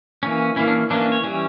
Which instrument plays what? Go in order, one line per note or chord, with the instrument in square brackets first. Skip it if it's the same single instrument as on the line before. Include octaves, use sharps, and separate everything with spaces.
[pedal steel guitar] E3 A#3 C#4
E3 A#3 C#4 E4
D4
E3 A#3 C#4 D4
D4
C#5
E3 G3 C#4